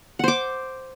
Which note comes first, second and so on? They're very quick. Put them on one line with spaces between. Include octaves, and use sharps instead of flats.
F#5 C5 D6